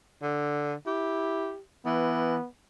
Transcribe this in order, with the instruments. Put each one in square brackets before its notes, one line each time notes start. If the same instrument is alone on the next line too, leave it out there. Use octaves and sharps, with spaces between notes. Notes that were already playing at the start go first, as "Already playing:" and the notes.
[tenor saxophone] D3
[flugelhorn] E4 [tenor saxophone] G4
[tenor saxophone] E3 [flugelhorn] B3